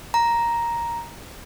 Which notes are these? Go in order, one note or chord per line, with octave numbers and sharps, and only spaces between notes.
A#5